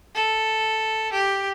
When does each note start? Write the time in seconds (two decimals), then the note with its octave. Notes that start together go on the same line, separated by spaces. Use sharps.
0.15 A4
1.12 G4